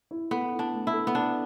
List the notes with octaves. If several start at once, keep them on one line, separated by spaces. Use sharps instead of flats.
E4
B3 A4
E4
D4
A3
E4
A4
B3
D4 A4